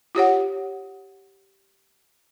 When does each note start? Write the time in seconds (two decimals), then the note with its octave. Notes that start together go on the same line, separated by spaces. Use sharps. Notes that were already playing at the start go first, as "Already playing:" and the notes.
0.15 F4 G4 C#5 F#5